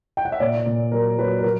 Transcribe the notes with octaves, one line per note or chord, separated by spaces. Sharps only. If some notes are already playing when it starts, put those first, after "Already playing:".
G5
F#5
E5
A#2 D5
A#2
F#3 A#4
F#3 B4
A#4
F#3